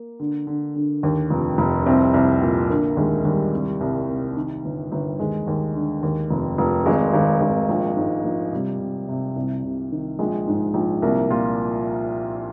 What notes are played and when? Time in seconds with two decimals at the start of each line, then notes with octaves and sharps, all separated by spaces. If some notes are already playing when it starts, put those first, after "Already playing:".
Already playing: A#3
0.20 D3
0.47 D3
0.75 D3
1.03 D#2
1.31 F1
1.58 F1
1.86 C2 C4
2.14 C2
2.41 A#2
2.70 D3 A#3
2.97 D#2 G#3
3.25 D#2 G3
3.52 C2
3.81 C2
4.08 C3
4.37 D#3
4.64 G1
4.92 G1
5.19 D#2 G#3
5.47 D#2
5.75 D3
6.03 D#2
6.30 F1
6.58 F1
6.86 G#1 G#3
7.13 G#1
7.41 G#1
7.69 A#1
7.97 G#2
8.25 A#1
8.53 C3 G3
8.80 C3
9.08 C3
9.36 C2
9.64 C2
9.91 D#3
10.19 A#1 G#3
10.47 G#2
10.74 A#1
11.02 C2 A#3
11.30 A#2 F4